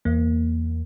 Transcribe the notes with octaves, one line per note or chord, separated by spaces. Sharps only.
E2 A#3